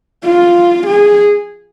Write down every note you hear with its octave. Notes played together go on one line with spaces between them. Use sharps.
F4
G#4